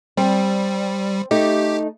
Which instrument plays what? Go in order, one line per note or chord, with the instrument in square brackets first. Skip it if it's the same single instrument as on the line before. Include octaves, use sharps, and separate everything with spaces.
[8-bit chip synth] G3 [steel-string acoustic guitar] C4
[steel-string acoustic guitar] A3 D#4 [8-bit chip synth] G4